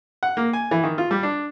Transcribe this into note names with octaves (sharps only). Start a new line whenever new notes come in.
F#5
A#3
G#5
E3
D#3
F4
G3
D4